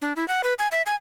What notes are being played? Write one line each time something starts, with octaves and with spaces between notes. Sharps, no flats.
D4
E4
F#5
B4
G#5
E5
G#5